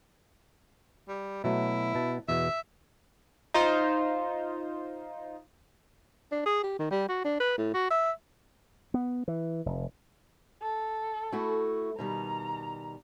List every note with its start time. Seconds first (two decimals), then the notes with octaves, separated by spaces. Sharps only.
1.08 G3
1.44 B2 F#3 A3 E4
1.95 B2 A5
2.29 E2 B2 E5
3.54 D#4 F4 C5
6.32 D4
6.45 G#4
6.63 G4
6.79 D#3
6.91 G3
7.09 F#4
7.25 D4
7.40 B4
7.58 A2
7.74 F#4
7.91 E5
8.94 B3
9.28 E3
9.66 F1
10.62 A4
11.32 A3 E4 F#4
11.99 B2 D#3 G3 A#5